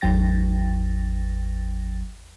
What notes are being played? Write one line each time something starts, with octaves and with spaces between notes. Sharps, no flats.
G#1 E2 F#3 G5 A6 A#6